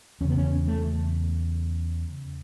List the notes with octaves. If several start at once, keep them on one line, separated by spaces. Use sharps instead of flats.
E2 C#3 B3 C#4
C#4
A3